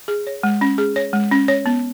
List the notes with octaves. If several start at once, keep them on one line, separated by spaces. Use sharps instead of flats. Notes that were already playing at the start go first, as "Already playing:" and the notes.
G#4
C#5
G#3
C#4
G#4
C#5
G#3
C#4
C#5
B3